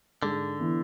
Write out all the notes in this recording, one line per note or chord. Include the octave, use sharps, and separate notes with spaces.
G#2 D3
E3 B3 E4